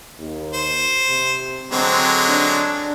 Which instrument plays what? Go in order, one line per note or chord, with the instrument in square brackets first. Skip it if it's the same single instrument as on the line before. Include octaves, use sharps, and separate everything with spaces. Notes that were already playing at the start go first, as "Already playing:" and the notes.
[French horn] D#2
[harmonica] C5
[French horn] C3
[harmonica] D3 F#3 G#3 [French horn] C4
[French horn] D4